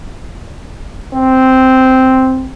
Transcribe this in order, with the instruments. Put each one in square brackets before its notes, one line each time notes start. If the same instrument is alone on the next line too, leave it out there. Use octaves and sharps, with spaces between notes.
[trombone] C4